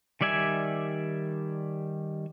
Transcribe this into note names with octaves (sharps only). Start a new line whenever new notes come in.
D#3 G3 D5 E5 G#5